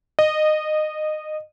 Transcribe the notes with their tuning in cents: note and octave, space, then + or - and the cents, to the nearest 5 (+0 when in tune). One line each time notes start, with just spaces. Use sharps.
D#5 -20